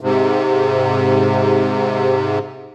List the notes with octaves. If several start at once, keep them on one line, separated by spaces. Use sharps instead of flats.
G#2 C3